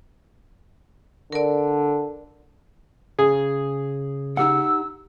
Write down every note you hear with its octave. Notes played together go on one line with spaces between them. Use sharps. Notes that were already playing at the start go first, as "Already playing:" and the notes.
D3 A#4 D5
C#3 G#4
D#4 G4 F#5 E6